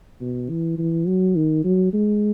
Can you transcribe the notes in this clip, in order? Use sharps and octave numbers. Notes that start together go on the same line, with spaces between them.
B2
E3
E3
F#3
D#3
F#3
G#3